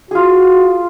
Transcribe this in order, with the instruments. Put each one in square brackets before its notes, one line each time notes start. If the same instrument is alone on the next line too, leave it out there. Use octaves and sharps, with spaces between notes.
[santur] F4 G#4 [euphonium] F#4